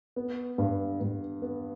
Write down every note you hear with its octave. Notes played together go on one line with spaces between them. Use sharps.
B3
G2
G2
B3